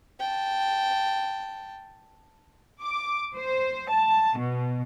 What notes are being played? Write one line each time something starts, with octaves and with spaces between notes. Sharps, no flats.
G5 A5
D6
C5
A5
B2